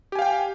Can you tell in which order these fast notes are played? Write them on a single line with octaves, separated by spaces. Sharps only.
G4 G#5 F5 G5